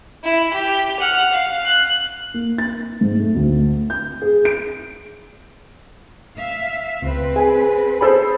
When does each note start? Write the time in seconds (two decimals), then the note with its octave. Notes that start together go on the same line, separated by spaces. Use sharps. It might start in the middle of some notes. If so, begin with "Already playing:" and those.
0.23 E4
0.53 G4
1.00 F#5 F6
1.33 F5
1.65 F#6
2.34 A#3
2.58 A6
3.01 G#2
3.20 A3
3.35 D2
3.90 G6
4.22 G#4
4.45 D7
6.36 E5 F5
7.02 C#2 C4 B4
7.36 G#4 G#5
8.01 G#4 A4 C5 B5